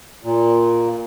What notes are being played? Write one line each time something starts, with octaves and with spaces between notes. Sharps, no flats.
A#2